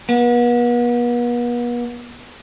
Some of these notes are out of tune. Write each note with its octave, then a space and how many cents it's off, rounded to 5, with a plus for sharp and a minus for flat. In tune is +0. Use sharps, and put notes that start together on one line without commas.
B3 -40